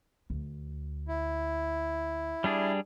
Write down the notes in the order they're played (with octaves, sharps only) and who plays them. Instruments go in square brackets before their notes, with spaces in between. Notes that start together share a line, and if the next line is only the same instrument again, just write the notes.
[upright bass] D2
[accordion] E4
[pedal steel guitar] G3 D4 G#4